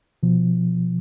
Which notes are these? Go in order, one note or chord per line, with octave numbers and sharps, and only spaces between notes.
B2 F3